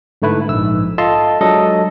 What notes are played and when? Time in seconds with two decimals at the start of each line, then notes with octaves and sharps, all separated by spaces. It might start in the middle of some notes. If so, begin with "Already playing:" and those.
0.22 G#2 D3 A3 E4 B4
0.49 A#1 G#2 E6
0.98 F4 A4 D#5 E5 A5 C6
1.41 F#3 G#3 D4 A4 D#5